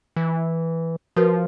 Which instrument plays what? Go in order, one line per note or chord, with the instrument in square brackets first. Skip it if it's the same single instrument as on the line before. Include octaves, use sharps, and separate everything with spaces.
[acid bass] E3
[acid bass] F3 [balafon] F#4 A#4 B4